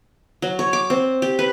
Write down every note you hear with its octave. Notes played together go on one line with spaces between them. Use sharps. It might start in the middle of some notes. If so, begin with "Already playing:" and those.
F#3
C#5
D6
C4
G4
B4